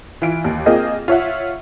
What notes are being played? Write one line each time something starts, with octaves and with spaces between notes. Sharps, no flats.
E3 F4 D7
D#2
A#3 C4 F4 G#4 A#4 D#5
F4 C#5 E5 F#5